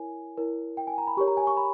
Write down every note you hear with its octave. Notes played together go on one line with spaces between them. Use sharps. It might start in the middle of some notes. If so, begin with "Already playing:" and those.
Already playing: E4 A#4 C#5 G#5
E4 A#4 C#5
G5
G#5
A#5
B5
G4 A#4 C#5 C#6
A#5
G#5
C#6
B5